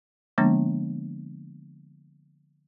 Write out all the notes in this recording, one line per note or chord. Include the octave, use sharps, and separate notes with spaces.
D3 F3 G#3 A#3 B3 D4